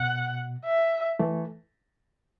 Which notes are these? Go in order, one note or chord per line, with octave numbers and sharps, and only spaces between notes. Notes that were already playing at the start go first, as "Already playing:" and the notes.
Already playing: B2 F#5
E5
E3 A3